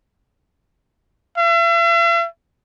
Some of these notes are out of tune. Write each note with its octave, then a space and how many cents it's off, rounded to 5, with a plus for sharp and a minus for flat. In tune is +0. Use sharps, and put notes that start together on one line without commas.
E5 +45